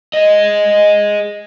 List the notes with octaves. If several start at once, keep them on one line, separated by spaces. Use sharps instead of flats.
G#4 D#5